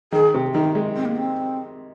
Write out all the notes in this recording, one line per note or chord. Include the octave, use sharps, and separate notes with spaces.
D#3 G#4
C3
D#3 D#4
G#3
C4
A#3
C4